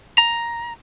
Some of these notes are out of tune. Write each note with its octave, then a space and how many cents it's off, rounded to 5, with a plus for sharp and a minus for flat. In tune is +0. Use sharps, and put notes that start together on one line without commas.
A#5 +5